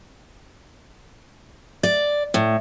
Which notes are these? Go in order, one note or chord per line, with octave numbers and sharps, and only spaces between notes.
D5
A2